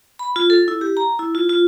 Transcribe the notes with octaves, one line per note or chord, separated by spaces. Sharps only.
B5
F4
A4
E4
G4
A#5
E4
F4
F4